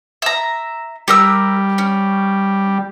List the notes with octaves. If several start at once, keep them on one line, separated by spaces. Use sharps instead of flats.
E5 A#5
G3 G4 A#4 E6
C#4